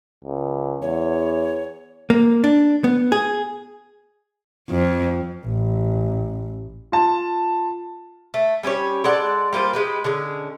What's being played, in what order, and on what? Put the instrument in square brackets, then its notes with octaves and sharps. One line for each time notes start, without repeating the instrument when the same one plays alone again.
[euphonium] C#2
[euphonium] E2 [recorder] C#5
[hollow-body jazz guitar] A#3
D4
B3
G#4
[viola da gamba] F2
[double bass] A1
[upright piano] F4 A5
[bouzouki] A3
G3 C#4 G4 C#5
G#3 A4 D5 F#5
G3 A#3 F4 C5
G#3 G4 B4
D3 G#3 C#4